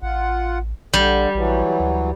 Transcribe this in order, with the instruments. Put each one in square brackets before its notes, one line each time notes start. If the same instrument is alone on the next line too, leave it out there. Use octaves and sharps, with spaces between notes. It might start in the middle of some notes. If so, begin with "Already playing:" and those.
[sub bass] A1 [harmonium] F4 F#5
[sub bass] A#1 [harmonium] D3 [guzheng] G3
[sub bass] A#1 [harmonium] E3 F#3
[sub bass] D2